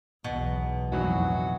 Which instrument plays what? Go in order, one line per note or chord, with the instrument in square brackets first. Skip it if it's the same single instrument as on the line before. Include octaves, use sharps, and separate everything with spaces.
[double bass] B1 E2 [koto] B2
[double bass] F2 A2 [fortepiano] E3 F#3 D#4 [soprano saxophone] F#4